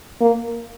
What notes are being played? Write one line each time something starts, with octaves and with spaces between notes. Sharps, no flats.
A#3